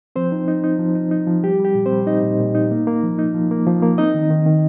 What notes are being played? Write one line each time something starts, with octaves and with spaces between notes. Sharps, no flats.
F3 C4 C5
D#4
D#4
D#4
F3
D#4
D#4
F3
G3 G4
G3
G4
A#2
C4 C5
G3
D#4 D#5
A#2
A#2
D#4
A#3
A#3
F3
D#4
F3
A#3
F3
A#3
C4 D#4 D#5
D#3
D#3
D#3